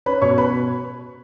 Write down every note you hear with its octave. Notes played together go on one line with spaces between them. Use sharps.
C#4 B4 B5
B2 C#5 C#6
B2 B4 B5